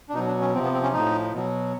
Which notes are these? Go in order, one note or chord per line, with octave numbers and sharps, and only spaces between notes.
D4
B2 F#3 D#4
D4
C#4
C3 F3 C4
B3
C4
C#4
A2 F3 D#4
B2 F#3